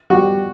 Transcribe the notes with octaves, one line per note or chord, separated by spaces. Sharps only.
G3 F#4